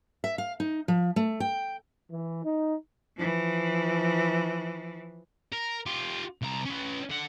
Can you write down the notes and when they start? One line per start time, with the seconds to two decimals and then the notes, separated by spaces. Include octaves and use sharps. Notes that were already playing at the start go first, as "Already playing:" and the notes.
0.24 E5
0.38 F5
0.60 D#4
0.88 F3
1.16 A3
1.40 G5
2.10 E3
2.44 D#4
3.16 E3 F3
5.53 A#4
5.86 F4 G4
6.42 C2 A#5
6.65 C#4 B4
7.10 D3 F#5